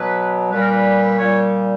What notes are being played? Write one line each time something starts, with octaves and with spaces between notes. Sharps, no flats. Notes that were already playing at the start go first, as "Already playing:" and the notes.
Already playing: B2 F#3 B4
A#2 G3 B4
A#4
B4
A#2 G3 C#5